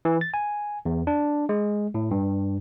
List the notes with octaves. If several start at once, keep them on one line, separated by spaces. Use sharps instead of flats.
E3
A6
G#5
E2
D4
G#3
A2
G2